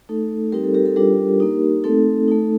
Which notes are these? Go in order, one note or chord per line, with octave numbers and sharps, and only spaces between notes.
A3 D#4 A4
G3 C4 D#4 G4 A#4
A4
G4 A#4
A4
G3 D4 F4 G4 A#4
A#3 D#4
A3 C4 D#4 A4
A3 D#4